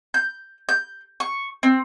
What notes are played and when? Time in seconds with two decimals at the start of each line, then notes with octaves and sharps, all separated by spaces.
0.14 G6
0.69 G6
1.20 C#6
1.63 C4